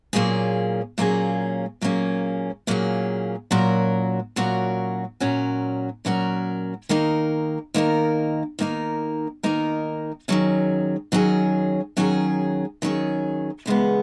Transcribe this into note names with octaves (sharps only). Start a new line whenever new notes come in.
A#2 F#3 A#3 C#4 G#4
A#2 F#3 A#3 C#4 G#4
A#2 F#3 A#3 C#4 G#4
A#2 F#3 A#3 C#4 G#4
A#2 F#3 C#4 F#4 A#4
A#2 F#3 C#4 F#4 A#4
A#2 F#3 C#4 F#4 A#4
A#2 F#3 C#4 F#4 A#4
D#3 A#3 D#4 A#4
D#3 A#3 D#4 A#4
D#3 A#3 D#4 A#4
D#3 A#3 D#4 A#4
D#3 F#3 C#4 G#4
D#3 F#3 C#4 G#4
D#3 F#3 C#4 G#4
D#3 F#3 C#4 G#4
E2 C#3 G#3 B3